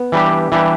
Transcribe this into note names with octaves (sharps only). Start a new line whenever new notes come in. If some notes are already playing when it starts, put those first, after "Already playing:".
Already playing: B3
E3 G3 D4 G4
E3 G3 D4 G4